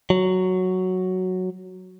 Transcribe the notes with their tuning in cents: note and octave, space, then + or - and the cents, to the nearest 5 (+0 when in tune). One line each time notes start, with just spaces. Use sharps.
F#3 +0